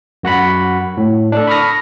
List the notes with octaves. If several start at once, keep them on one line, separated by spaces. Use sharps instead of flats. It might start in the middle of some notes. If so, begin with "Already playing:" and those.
F#2 F#4 F#5 B5
A2
D4 A4
B5 C#6 D#6 F6 A#6